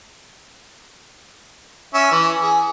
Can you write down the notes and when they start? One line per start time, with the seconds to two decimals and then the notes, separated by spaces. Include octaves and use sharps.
1.94 C#4 E5
2.12 E3
2.42 G#4